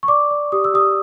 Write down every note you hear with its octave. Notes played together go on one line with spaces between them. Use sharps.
C#6
D5 D6
D5
G4 D#6
E6
G4 D#6